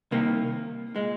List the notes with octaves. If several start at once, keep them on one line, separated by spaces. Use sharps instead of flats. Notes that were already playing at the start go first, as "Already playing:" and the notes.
C2 C3 D#3 A#3
A#2 G#3